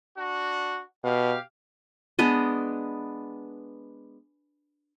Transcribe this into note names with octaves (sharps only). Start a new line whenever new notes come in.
D4 F#4
B2 G4 F5
G#3 B3 D4 D#5